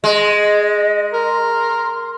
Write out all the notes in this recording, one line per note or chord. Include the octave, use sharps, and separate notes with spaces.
G#3 D#5
A#4 C6